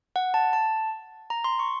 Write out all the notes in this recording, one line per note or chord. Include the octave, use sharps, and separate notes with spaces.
F#5
A5
A5
A#5
C6
C#6